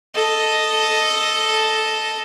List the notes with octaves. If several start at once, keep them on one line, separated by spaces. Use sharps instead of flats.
A4 D#5